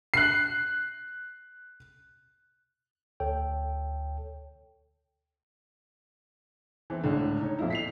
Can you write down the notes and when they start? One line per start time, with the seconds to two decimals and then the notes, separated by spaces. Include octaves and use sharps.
0.14 F#6 C7
3.20 D2 A4 C#5 G5
6.90 E3 C4
7.03 C#2 A2 D3
7.41 D#4 C#5
7.59 F2 A#2 E4
7.70 B6 C7 F7